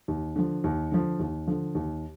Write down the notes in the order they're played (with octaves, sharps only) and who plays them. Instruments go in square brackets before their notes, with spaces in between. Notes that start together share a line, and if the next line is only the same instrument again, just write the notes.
[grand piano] D#2
D3 F3
D#2
D3 F3
D#2
D3 F3
D#2